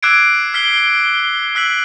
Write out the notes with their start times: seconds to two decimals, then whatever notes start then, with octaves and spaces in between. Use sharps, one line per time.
0.03 D6 E6 F#6 G#6 C7 D7
0.54 F6 B6 C7 G7
1.55 E6 F#6 B6 F#7